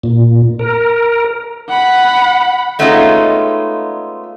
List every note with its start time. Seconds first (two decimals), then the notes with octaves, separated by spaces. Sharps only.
0.03 A#2
0.59 A#4
1.70 F#5 B5
2.79 G#3 A3 B3 C#4 D#4 F4